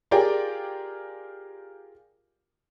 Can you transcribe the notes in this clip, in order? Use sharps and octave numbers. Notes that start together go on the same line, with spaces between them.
F4 G4 G#4 A#4 D5 G5